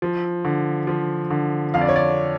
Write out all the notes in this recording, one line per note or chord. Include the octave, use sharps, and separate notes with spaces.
F3
D3
F3
D3
F2 F5
D5
C#5
D5